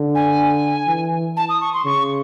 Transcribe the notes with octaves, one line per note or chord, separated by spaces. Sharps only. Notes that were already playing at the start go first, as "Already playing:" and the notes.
Already playing: D3
G#5
E3
A5
D#6
C#6
C6
C#3 C#6